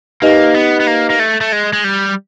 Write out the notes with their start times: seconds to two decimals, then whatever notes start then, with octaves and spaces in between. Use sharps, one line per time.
0.22 A#3 D#4 G4 B4 D#5
0.54 B3
0.80 B3
0.87 A#3
1.10 A#3
1.19 A3
1.41 A3
1.52 G#3
1.73 G#3
1.84 G3